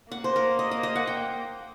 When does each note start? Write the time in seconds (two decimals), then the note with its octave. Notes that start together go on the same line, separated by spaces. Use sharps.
0.12 A#3 F#5
0.24 C5
0.36 A#4
0.59 D#5
0.71 D#5
0.83 D#5
0.96 F#5
1.07 G5